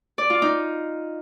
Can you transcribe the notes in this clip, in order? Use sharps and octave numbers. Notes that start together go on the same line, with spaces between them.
D5
F4
D#4